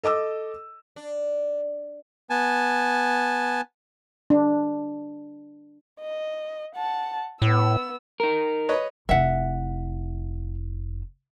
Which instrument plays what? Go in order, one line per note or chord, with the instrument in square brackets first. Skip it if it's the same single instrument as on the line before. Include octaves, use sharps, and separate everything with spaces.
[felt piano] A4 D#5 D6 E6
[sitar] D4
[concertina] B3 G#5 A5
[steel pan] D4
[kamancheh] D#5
F#5 A5
[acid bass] A2 [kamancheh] B3 E6
[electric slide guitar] D#4 A#4
[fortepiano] B4 C#5 D#5
[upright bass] F1 E4 [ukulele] E5 F#5